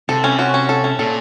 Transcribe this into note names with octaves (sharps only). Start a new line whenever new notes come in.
C3 A4
C#4
F#4
C#4
A4
C#4
A#2 A4